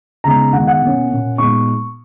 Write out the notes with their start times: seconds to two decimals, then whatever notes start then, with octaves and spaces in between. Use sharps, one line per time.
0.24 C#3 G#3 B3 D#4 A#5
0.53 D#3 G#3 B3 D#4 F#5
0.67 F#5
0.82 B2 A#3 C#4
1.10 A#2 A#3 C#4
1.38 A#2 G#3 B3 D#4 C#6